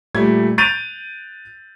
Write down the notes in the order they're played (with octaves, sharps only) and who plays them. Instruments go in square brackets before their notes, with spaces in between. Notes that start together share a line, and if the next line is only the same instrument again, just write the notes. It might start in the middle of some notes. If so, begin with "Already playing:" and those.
[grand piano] A#2 G3 A3 G#6
F#6 G6 A6 D7 D#7 F7